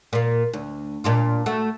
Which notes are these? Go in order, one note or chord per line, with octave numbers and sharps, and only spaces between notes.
A#2 A#3
D2
A#2 D4 F4
A3 F#4